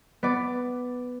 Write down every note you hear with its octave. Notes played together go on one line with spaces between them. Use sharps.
B3 D5